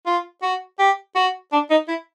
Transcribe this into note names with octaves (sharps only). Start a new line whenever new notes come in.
F4
F#4
G4
F#4
D4
D#4
E4